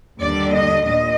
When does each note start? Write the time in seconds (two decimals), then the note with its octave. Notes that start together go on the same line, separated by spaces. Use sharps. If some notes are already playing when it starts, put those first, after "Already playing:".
0.21 D#2 D3 G3 D4 D5
0.54 D#5
0.88 A#2 D#5